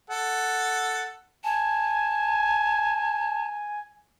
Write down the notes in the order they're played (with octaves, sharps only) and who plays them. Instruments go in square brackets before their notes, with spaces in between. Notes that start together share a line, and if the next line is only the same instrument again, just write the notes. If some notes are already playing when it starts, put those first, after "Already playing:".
[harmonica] A4 F#5
[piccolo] G#5 [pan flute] A5